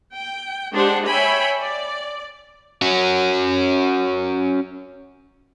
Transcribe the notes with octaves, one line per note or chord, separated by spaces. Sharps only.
G5
G#3 D4 G4 C5 F#5
C#5 E5 G5 G#5 B5
D5
C#4 F#4